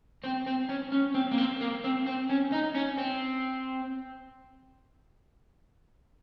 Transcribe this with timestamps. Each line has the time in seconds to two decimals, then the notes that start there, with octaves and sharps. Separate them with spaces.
0.24 C4
0.47 C4
0.69 C#4
0.92 C#4
1.15 C4
1.31 A#3
1.38 C4
1.61 A#3
1.84 C4
2.06 C4
2.29 C#4
2.52 D#4
2.75 C#4
2.98 C4